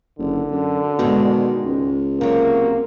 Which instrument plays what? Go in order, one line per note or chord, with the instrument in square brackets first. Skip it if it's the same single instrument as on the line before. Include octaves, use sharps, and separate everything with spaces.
[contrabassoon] F#1 [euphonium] D3
[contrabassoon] F#2
[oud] G#2 D#3 G#3 [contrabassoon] B2
[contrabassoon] C#2
[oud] C3 F#3 [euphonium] A#3